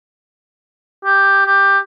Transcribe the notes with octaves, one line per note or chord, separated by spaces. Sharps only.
G4
G4